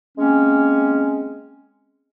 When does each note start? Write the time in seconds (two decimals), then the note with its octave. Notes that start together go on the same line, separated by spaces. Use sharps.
0.18 G#3 A#3 C4 C#4